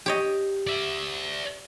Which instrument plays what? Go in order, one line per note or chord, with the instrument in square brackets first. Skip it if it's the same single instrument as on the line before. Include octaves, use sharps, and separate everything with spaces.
[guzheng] G4 C#5 D#5
[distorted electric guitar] D5 E5